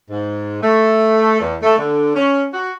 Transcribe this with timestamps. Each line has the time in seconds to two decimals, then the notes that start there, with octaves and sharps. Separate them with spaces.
0.10 G#2
0.62 A3
1.41 E2
1.63 A3
1.79 D3
2.16 C#4
2.53 F#4